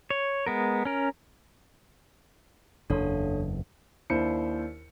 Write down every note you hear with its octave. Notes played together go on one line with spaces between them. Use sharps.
C#5
G#3 B3 A#4
C#4 A#4
F#1 E2 D4 A4 C#5
D#2 D4 E4 C5 C#7